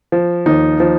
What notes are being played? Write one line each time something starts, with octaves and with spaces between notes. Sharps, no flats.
F3
D#2 D#4
F3